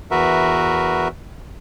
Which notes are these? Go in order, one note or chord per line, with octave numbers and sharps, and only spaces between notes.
E2 F#4 A#4 B4 E5